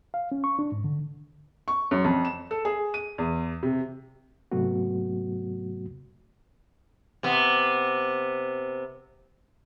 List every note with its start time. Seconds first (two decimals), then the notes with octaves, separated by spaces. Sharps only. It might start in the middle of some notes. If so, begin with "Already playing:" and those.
0.14 F5
0.32 C#4
0.44 C#6
0.59 D4
0.72 G#2
0.84 D3
1.68 C#6
1.91 F#2
2.04 F2
2.25 E7
2.51 A4
2.65 G#4
2.94 D#7
3.18 E2
3.63 C3
4.52 G#2 C3 F#3 A3 B3 F#4
7.23 C3 B3